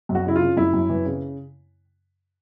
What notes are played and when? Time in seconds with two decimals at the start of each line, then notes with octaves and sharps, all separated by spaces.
0.09 F#2
0.15 F#4
0.25 C#3 E4
0.36 F4
0.41 C#3
0.57 F#2 E4
0.73 F#2
0.89 E3
1.05 C#3